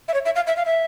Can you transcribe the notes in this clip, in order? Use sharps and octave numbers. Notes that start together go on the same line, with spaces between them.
E5
C#5
E5
F5
E5
F5
E5